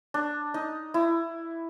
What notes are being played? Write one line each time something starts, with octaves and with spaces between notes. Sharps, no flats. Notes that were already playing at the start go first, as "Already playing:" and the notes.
D4
D#4
E4